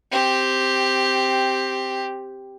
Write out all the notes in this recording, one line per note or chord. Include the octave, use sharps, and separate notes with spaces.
C4 G4